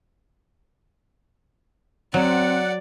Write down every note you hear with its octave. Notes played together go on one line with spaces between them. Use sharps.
F#3 C4 D5 F#5